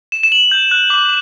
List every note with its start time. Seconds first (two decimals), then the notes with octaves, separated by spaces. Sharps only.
0.12 E7
0.23 E7
0.32 F#7
0.52 G6
0.71 F#6
0.90 D6